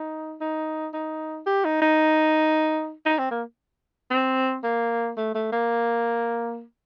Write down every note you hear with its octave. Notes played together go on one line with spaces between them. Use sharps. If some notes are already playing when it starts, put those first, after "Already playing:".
Already playing: D#4
D#4
D#4
G4
D#4
D#4
D#4
C4
A#3
C4
A#3
A3
A3
A#3